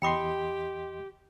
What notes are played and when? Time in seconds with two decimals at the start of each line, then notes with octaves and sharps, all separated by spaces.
0.02 E2 G4 D#5 G5 B5 C6 D6